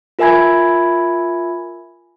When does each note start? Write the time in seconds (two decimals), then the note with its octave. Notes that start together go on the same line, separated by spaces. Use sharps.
0.19 F4 A#4 E5 G#5 B5 G#6